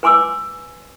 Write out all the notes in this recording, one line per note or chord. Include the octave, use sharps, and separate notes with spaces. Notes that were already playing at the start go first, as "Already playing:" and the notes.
B4 G#5 C6 D6 E6